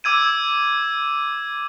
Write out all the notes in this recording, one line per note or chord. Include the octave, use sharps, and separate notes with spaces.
D6 E6 G#6 D#7